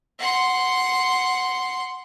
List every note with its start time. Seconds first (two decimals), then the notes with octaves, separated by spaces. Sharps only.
0.19 F#5 C6